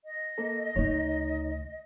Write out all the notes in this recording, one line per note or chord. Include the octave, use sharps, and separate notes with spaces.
D#5
A#3 A4
D2 C#3 D#4 C#5